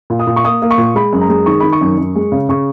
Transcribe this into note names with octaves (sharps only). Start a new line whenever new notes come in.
A#2
D#6
A#2
C#6
A#3 D#6
A#3
C#6
A#2
G#3 B5
F#2
A#5
G#3
D#3 C#6
D#3 B5
C#6
F#2
F#2
G#3
C#3
C#3 C#6